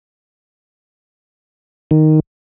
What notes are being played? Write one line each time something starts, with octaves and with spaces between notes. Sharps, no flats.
D#3